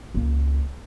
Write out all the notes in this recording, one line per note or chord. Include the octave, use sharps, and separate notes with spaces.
C#2 A#3